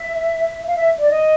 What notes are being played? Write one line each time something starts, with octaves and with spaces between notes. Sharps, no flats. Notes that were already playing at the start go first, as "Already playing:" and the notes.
Already playing: E5
F5
E5
D5
D#5